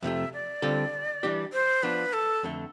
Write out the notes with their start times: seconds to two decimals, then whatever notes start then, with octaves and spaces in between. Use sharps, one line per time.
0.02 F2 C3 F3 A3 E5
0.33 D5
0.62 D3 G3 C4 F4 A4
1.23 E3 G3 D4 G4
1.53 C5
1.83 F3 B3 D4 F4 B4
2.13 A4
2.43 F2 D3 A3